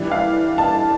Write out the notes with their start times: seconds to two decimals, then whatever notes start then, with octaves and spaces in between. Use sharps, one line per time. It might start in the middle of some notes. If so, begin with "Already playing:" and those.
Already playing: E3 G3 D4
0.12 F5
0.58 A5